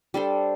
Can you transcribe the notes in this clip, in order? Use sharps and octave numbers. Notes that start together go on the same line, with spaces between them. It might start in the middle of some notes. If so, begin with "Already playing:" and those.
G3 D4 A4 C5